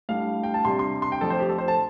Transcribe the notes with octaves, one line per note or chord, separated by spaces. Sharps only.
A2 G3 D4 F5
G5
A5
C3 G3 D4 C6
C6
C6
G5
F2 D3 F3 A3 A4
C5
G4
A4
C5
A5